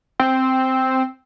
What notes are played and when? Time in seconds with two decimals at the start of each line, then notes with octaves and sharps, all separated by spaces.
0.19 C4